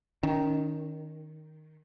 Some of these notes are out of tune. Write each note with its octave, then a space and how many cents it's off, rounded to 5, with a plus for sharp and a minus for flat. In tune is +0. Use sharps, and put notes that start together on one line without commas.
D#3 +0 C#4 +30